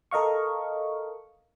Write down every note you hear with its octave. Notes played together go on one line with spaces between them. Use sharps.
A4 A#4 D#5 F5 C#6